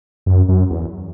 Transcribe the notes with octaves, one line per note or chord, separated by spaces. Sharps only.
F#2
F#2
E2